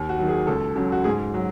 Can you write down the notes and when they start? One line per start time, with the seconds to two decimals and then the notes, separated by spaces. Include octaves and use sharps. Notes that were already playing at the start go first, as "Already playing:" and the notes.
Already playing: D#2
0.09 F#4
0.18 D#3 F#3
0.29 G#4
0.47 C#2 A4
0.76 C#3 F#3
0.92 F#4
1.04 G#2 G#4
1.34 F#3